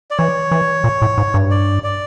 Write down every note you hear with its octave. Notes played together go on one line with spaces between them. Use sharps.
D5
E3 C#5
E3
A#2
A2
G#2
G2
D5
D5